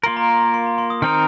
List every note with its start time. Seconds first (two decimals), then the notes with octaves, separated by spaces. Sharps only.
0.03 A#3 F4 A#4 C6
0.17 A#5
0.29 C6
0.41 A#5
0.54 C6
0.66 A#5
0.78 C6
0.90 D#6
1.02 D#3 C4 D#4 A#4 F6